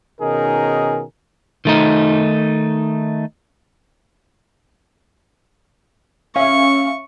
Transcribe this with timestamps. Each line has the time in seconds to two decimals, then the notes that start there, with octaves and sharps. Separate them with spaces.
0.21 B2 D#3 C#4 D#4 G#4 A#4
1.65 D#3 A3 D#4
6.36 C#4 E5 F5 C#6